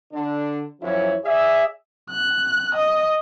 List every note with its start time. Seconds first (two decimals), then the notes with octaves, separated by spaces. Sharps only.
0.12 D3 D4
0.81 F#2 E3 F3 E4 C#5
1.24 G#4 D5 E5
2.11 F#6
2.75 D#5